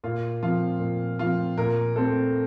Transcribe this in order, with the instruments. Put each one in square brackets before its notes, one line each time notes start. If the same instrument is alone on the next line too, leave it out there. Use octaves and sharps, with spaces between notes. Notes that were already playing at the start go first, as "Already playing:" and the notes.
[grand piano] A#2 [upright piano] F4
[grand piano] F3 C4 [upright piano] F4
[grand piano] A#2
[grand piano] F3 C4 [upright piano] F4
[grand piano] A#2 [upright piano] A#4
[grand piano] A3 C4 [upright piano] A4